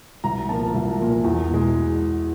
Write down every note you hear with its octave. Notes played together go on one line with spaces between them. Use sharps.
C2 A#5
A#2 F3 A#3 A5
C2
A#2 F3 A#3
E2
B2 G#3